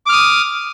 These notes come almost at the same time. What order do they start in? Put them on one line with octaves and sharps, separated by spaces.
D6 F6 D#6